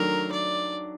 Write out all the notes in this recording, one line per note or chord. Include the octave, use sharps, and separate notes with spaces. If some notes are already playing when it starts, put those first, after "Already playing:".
Already playing: D#3 F#3 A3 D4 A#4
D5